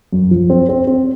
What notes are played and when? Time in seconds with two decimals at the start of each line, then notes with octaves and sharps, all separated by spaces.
0.12 F#2
0.31 F3
0.50 C4
0.69 C4
0.87 C4